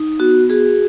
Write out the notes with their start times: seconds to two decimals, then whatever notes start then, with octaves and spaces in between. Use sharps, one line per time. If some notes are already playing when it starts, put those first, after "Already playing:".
Already playing: D#4
0.19 B3 F#4
0.50 F#4 G#4